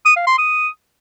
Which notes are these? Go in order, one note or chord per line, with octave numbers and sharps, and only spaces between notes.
D#6
F5
C6
D#6